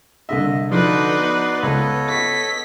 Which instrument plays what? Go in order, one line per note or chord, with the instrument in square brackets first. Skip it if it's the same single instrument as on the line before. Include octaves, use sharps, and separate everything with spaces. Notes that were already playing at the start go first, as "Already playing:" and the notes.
[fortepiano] C2 D3 E5 [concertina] D#5
[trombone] D3 [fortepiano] F3 [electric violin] D#4 B4 [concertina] F#4 D5 C6
[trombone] B3
[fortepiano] C#2 B4 [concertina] A4 C#5 D#5
[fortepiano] C#6 [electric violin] B6